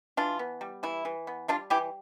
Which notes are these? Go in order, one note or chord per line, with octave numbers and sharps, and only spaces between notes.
E3 D4 F4
B3
G3
E3 E4
E3
B3
G3 D4 F4
E3 E4 G4